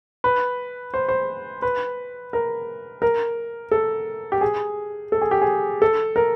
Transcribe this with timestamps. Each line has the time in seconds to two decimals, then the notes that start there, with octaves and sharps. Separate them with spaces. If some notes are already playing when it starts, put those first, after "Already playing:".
0.24 B4
0.94 C5
1.09 C5
1.62 B4
2.33 A#4
3.02 A#4
3.71 A4
4.32 G4
4.41 G#4
5.12 A4
5.22 G#4
5.31 G4
5.42 G#4
5.82 A4
6.16 A#4